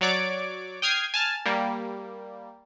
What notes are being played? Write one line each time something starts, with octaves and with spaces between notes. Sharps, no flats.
F#3 C#5 D5 D6 D7
G5 D#6 F6 G#6 C7
G#5 A5 F6
G3 A#3